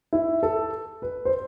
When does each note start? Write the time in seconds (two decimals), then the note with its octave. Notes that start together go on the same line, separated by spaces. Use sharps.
0.13 E4
0.43 A4
1.02 B4
1.25 C5